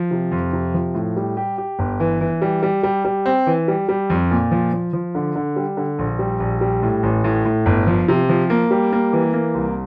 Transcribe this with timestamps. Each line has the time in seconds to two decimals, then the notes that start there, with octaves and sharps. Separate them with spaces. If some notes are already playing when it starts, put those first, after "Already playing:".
Already playing: F3
0.11 C3
0.31 F2
0.53 C3
0.74 F3
0.94 A2
1.16 G3
1.37 G4
1.58 G4
1.79 G1
2.00 E3
2.21 E3
2.42 G3
2.63 G3
2.83 G3
3.05 G3
3.26 C4
3.47 E3
3.68 G3
3.89 G3
4.10 F2
4.31 A#2
4.51 F3
4.73 F3
4.93 F3
5.15 D3
5.36 D3
5.56 G3
5.77 D3
5.99 A#1
6.19 G3
6.40 A#1
6.61 G3
6.83 A2
7.03 A1
7.24 A2
7.45 A2
7.66 G1
7.87 F3
8.08 C3
8.29 F3
8.50 A#3
8.71 G3
8.92 A#3
9.13 E3
9.33 A#3
9.55 C2